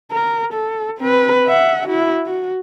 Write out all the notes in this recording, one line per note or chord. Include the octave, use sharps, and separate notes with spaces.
A#4
A4
C4 B4
E5 F#5
E4 F#4
F#4